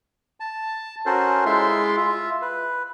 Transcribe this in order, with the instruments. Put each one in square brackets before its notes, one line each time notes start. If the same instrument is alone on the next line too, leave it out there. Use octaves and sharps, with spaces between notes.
[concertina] A5
C#4 F#4 A4 A#4 C5
G#3 E4 F4 E5 C6
F4 E5
B4